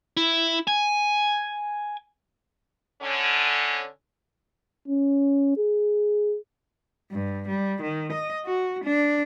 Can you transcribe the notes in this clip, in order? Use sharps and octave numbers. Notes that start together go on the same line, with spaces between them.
E4
G#5
D3 C#4
C#4
G#4
G2
G3
D#3
D#5
F#4
D4